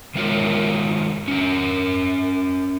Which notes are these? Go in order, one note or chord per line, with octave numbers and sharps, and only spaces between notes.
D#3 G#3 F4 F#4 A#4 C#5
C#4 A#4